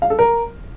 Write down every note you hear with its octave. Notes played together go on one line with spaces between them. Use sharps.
F5
A4
A#4